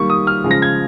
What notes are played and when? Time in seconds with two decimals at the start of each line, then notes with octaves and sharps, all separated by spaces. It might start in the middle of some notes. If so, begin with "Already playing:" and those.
Already playing: D#3 G3 A#3 C#6
0.10 D#6
0.27 F6
0.44 C#3 F3 G#3
0.51 A#6
0.62 G#6